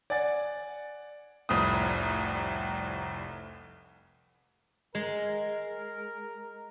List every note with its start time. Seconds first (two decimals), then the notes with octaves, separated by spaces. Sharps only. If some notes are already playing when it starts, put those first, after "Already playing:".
0.10 D5 F#5 G#5 A6
1.49 F1 C2 A2 D#6
4.95 G#3 A#4